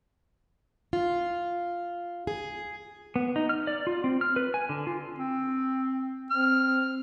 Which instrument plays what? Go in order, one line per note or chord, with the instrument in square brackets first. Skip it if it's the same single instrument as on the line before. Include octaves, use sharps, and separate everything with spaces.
[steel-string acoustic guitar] F4
G#4
[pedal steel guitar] B3
D#4
F6
D5
F4
C4
F6
B4
G#5
D3
F4
[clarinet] C4
[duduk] C4 [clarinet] F6